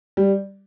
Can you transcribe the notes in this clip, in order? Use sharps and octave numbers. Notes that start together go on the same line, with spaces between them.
G3